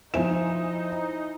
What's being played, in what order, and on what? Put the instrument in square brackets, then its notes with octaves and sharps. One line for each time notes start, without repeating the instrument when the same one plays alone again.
[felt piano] F3 E7 [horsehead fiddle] D#4 [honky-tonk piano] E4 C5 G#5